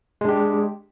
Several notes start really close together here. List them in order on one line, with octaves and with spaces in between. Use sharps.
G#3 D4 G4